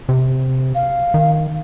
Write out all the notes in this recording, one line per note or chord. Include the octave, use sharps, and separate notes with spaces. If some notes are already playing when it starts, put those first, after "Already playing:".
C3
F5
D#3